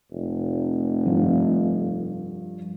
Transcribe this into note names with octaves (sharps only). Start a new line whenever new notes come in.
F1
G2 F3